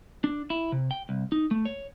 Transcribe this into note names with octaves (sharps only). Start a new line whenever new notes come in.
D4
E4
C3
G5
C2
D#4
A3
C#5